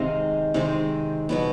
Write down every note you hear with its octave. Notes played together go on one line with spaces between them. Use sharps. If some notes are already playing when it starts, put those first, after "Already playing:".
Already playing: C3 D#3 G#3 C4 D#5 F5
C3 D#3 G#3 C4
B2 F#3 B3